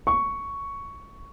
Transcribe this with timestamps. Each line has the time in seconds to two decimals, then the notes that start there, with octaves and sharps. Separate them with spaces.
0.07 C#6